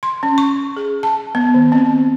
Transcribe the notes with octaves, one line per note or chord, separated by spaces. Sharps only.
C6
C#4
C#6
G#4
A5
B3
D#3
C4